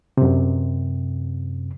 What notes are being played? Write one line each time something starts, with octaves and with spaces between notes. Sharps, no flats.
F#2 C3